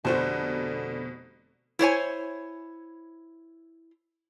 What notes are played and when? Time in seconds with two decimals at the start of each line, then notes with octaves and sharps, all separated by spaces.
0.05 F1 B2 D3 F#4 C5 A5
1.79 E4 C5 C#5 G#5